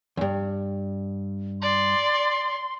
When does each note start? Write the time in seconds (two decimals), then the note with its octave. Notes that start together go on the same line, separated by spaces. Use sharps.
0.17 E2 G2
1.62 D5 C6